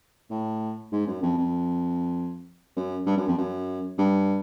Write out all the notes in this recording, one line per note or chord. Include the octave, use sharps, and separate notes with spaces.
A2
G#2
F#2
F2
F2
F#2
G2
F#2
F2
F#2
G2